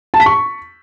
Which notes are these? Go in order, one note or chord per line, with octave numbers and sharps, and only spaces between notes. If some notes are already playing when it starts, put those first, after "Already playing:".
A5
B6
C#6